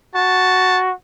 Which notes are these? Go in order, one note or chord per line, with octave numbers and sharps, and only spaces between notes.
F#4 A5